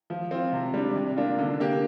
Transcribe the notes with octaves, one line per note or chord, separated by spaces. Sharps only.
F3
C4 F4
C3
G3 D4
C3
A#3 D4 F4
D3
A#3 G4